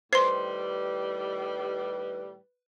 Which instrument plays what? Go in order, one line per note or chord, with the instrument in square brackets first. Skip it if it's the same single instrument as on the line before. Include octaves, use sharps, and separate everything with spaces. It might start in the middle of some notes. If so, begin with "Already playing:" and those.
[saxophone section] A2 D#3 G3 [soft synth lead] B4 [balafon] C5 [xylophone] C6 C7